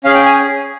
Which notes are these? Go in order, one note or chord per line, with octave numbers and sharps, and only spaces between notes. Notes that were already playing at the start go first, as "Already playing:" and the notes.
C#4 G#4 F5
G5
G#5